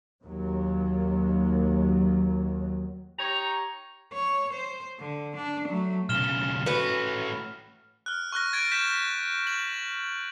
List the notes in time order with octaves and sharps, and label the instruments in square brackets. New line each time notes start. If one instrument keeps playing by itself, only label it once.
[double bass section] D#2 F#3
[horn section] D#4 G4 C#5 A#5
[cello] C#5
C5
D3
D4
F#3 A3
[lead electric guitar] B1 C#3 [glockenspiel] F6 E7 G7
[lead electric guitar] A3 C#4 [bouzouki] F#4 B4
[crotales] F6 F#6
C#6 F6 F#6 A#6
G#6 A6 D7
G6 A#6 B6 E7
F#7